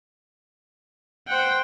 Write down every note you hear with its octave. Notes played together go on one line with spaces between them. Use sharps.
C5 F#5 G5